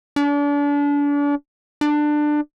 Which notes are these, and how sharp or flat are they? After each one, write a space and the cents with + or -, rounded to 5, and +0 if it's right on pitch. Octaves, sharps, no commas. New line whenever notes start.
D4 -35
D4 +20